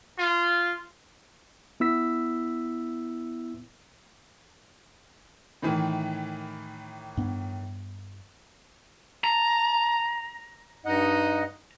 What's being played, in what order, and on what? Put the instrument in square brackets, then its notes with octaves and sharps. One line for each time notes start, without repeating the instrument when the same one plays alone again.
[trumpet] F4
[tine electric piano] B3 E4 E6 B6
[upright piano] A2 D#3 E3
[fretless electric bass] G2 B3
[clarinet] A5 [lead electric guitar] A#5
[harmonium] G2 D#5 F#5 [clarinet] D#4